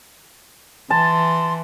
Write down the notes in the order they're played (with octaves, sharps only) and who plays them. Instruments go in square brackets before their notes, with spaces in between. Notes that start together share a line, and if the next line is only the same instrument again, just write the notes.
[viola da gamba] E3 [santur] A5 [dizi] C6